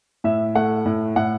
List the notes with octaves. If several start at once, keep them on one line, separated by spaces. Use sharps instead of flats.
A2 E5
A3 F#5
A2
A2 F#5